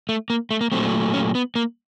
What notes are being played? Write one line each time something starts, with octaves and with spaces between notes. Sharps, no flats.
A3
A#3
A3
A#3
A#2 F#3 A3 C4
C#4
B3
A#3